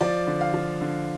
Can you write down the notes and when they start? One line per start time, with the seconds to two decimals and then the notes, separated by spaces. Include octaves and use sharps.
0.01 F3 D5
0.27 D3
0.41 F5
0.54 F3
0.81 D3